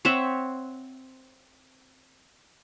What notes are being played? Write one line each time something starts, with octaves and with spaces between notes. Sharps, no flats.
C4 C#5 E5 F#5